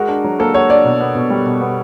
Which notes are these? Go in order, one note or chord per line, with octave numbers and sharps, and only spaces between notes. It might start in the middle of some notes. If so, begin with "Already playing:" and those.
Already playing: G#3 F#4 A#4
D4
F#3
A#3 A4
F#4 C#5
D4 D5
B2
B3
B2
G3
B2
B3